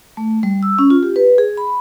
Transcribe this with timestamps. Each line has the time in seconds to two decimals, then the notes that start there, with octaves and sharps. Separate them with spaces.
0.17 A3
0.43 G3
0.63 E6
0.79 C#4
0.90 F4
1.03 G4
1.16 B4
1.38 G#4
1.57 B5